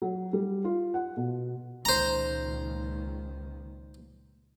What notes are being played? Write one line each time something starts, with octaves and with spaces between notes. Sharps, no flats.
F#3
G3
F4
F#5
B2
C#2 A#2 D#3 C5 A#5